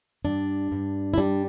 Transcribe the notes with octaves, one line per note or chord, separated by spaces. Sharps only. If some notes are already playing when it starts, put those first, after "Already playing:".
G2 D4
G2
E4
G3 D4